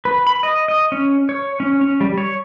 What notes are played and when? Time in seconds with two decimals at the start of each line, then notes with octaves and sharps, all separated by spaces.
0.05 B4
0.27 B5
0.43 D#5
0.68 D#5
0.92 C#4
1.29 C#5
1.60 C#4
1.81 C#4
2.01 G3
2.18 C#5